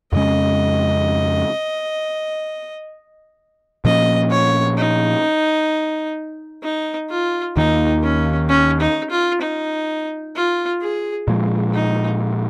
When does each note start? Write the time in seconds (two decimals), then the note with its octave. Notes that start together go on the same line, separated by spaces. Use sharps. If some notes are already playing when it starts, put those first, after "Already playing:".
0.13 F2 C#3 G#3 C#4 D#5
3.85 A#2 F3 A#3 C#4 D#5
4.31 C#5
4.78 D#4
6.63 D#4
7.10 F4
7.56 D#2 D#3 A#3 D#4
8.03 C#4
8.49 C#4
8.81 D#4
9.10 F4
9.41 D#4
10.35 F4
10.81 G#4
11.28 A#2 F3 G#3
11.74 D#4